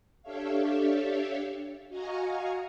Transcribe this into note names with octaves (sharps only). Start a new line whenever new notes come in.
D4 G4 A4 C#5 E5 F5
F#4 D#5 F5 G#5 A#5 C#6